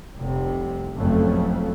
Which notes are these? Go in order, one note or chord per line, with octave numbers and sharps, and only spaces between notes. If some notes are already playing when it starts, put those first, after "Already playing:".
F1 C2 C3
F#1 F2 A2 C#3 A3